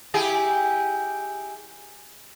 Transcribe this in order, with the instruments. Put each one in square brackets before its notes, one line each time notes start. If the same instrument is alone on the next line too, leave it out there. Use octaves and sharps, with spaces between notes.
[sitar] E4 G4 G#4